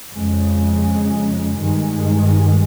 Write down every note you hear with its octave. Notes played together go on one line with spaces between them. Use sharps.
F2 C#3 G#3
G2 D#3 G#3